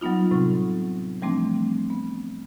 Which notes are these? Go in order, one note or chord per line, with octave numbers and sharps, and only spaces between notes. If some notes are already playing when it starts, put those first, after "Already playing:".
F#3 G3 B3 D#4 F4
A2 C3 F#3 C4
E3 F3 G3 A3 C4 D4
B3